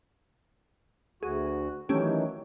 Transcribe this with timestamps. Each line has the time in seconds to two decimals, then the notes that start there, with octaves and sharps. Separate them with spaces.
1.23 D2 F#4 G#4
1.89 D#3 E3 F#3 A3 C#4 G4